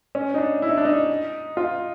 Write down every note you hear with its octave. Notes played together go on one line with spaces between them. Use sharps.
C#4
D#4
D4
E4
D#4
D4
D#4
F4